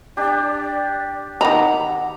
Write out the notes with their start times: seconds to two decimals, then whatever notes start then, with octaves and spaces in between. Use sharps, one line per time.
0.17 D4 G4 D5
1.41 D#3 F#5 A#5 B5